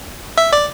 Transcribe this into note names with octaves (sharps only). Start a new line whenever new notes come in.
E5
D5